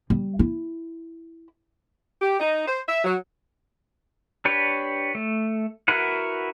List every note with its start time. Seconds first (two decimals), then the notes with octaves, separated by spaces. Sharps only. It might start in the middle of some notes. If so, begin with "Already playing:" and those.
0.10 G3
0.39 E4
2.22 G4
2.40 D#4
2.67 C5
2.88 E5
3.05 F#3
4.45 D4 G4 B4 C#5
5.15 A3
5.88 E4 F#4 A#4 B4 F#5